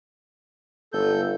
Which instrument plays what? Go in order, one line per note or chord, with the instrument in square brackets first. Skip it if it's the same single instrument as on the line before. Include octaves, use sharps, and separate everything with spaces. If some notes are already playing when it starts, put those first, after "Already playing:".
[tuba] G1 [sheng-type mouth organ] A4 G6